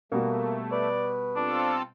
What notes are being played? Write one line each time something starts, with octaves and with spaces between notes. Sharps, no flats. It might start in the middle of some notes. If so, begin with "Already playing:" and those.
B2 G3 A3 A#3 F#4
B4 D5
C4 D4 F4 A4